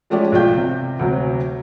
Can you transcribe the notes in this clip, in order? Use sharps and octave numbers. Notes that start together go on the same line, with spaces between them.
F3 G#3 A3 C#4 G4 D5
B1 F3 F4 D5 G5 G6
C3
D2 C3 F#3